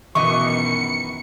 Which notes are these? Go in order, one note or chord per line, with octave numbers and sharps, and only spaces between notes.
F#2 B2 D#3 E3 B3 D#5 C#6 C#7